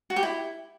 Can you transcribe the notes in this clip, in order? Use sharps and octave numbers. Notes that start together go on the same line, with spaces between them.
F#4
G4
E4